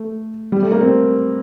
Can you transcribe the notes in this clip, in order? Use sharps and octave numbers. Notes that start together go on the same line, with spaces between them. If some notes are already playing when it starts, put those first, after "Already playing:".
Already playing: A3
G3
A3
A#3
C4